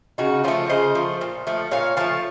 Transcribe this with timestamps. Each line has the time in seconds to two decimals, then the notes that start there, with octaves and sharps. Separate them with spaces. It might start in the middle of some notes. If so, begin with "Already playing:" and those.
0.18 C#3 D#4 F#4
0.44 F3 C#4 F4
0.48 A3
0.70 C#3 C5 D#5
0.95 F3 A3
1.21 A#2
1.47 F3 A3
1.71 A#2 C#5 F5
1.97 F3 A3 F5 A5